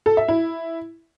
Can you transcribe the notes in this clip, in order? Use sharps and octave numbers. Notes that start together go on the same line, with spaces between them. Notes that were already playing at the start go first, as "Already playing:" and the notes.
A4
E5
E4